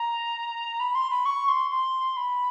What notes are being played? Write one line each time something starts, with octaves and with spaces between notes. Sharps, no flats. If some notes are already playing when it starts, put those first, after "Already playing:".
Already playing: A#5
B5
C6
B5
C#6
C6
C6
B5